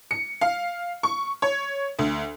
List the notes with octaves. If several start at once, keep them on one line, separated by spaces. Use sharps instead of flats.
C#7
F5
C#6
C#5
D2